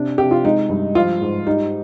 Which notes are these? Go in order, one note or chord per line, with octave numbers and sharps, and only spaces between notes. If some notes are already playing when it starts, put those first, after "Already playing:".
Already playing: C3 D4
C3 G4
F4
G#3 D#4
G2
F3 F4
G#2
G3 D#4